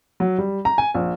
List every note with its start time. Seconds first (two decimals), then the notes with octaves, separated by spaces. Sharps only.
0.20 F#3
0.38 G3
0.65 A#5
0.78 G#5
0.94 A#1